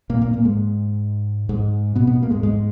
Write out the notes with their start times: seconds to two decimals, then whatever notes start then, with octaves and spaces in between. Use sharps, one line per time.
0.10 A#2 A#3
0.21 A#2 A#3
0.33 A#2 A#3
0.45 G#2 G#3
1.49 G#2 G#3
1.96 B2 B3
2.07 B2 B3
2.23 A#3
2.30 G#2 G#3
2.43 G#2 G#3